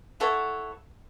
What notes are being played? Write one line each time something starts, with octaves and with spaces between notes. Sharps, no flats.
E4 A4 C#5 F#5